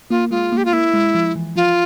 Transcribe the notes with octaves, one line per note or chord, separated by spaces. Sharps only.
A#3 F4
G#3 F4
A#3
G4
F4
A#3 E4
G#3
F3
E3
F3 F4